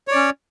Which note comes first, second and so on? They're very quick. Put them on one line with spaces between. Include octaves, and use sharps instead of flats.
C#5 D5 C#4